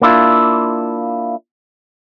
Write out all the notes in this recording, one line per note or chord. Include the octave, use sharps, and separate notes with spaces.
A#3 D4 E4 F4